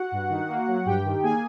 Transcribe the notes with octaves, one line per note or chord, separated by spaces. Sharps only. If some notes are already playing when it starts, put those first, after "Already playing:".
Already playing: F#4 F#5
G2
D#3
A#3
F#3
G2 G4 G5
D#3
A#3 G#4 G#5